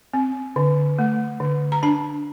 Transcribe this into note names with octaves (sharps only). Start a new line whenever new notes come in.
C4
D3
A3
D3
A#5
D4 A5